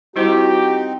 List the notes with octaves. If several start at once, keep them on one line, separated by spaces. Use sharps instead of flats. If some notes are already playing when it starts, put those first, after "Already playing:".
G3 C4 D#4 E4 F#4 G4 C5